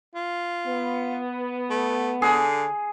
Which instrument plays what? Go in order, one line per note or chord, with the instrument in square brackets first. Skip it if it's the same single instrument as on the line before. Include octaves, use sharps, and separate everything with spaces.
[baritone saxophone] F4
[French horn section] B3
[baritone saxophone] A3
[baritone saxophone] D3 [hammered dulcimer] G#4